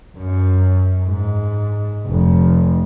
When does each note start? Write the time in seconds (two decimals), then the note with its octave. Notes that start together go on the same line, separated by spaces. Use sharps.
0.17 F#2
1.05 G#2
2.06 F1